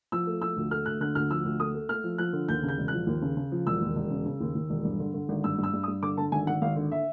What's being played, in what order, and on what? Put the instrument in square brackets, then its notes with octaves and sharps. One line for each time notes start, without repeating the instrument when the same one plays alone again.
[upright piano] F3 E6
A3
F3 E6
D2
A3 F6
D2 F#6
D3 F#6
D2 F6
F3 E6
D2
A3 D#6
A3
A3 F6
F3
F3 F#6
D3
D#2 G6
C#3
G6
E1
F3 F#6
D#2
C#3
C#3
F3
E1 E6
D#2
E1
C#3
C#3
D#2
D#2
E1
G2
D3
D3
G#1
G2 E6
G2
E6
G2
D#6
G2
D3 D6
D3 A5
G#1 G#5
G#1 F#5
G#1 F5
D3
E5